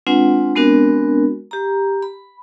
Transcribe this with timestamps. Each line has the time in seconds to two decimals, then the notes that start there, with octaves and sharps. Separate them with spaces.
0.07 G#3 C4 D4 F4 B4 F#5
0.56 G#3 B3 C4 D4 F#4 A#4
1.51 G4 A#5
2.02 B5